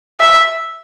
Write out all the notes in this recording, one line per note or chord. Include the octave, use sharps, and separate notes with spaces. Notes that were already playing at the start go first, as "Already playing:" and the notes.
E5